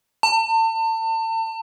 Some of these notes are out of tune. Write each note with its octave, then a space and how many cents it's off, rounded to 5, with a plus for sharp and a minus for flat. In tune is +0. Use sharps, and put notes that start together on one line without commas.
A5 +35